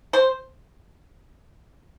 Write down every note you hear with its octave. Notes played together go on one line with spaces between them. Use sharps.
C5